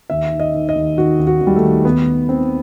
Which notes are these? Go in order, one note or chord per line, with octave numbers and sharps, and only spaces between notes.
D#2 E5
D#3
D#5
D#3
D#5
D#2
D#3 F#4
D#2
F#4
D#2
G3
A3
D#3
D#2 B3
D#2
D#3 C4